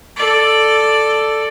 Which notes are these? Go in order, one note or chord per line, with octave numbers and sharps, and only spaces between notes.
A4 D5